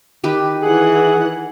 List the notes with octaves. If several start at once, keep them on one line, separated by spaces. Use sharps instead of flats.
D#3 G4 B4
E3 G#4 F#5